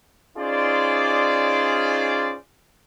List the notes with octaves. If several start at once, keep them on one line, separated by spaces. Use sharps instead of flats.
C#4 D#4 F4 G#4 C5 D5